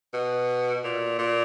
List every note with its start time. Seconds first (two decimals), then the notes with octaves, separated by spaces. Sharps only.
0.13 B2
0.83 A#2
1.18 A#2